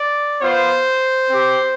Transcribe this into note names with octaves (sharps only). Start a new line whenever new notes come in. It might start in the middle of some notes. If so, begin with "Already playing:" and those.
Already playing: D5
B3 F4 C5
C4 G4